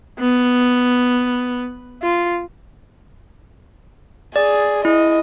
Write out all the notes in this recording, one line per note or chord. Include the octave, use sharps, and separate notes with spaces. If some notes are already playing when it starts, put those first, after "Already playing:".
B3
F4
G#4 D5
E4 D#5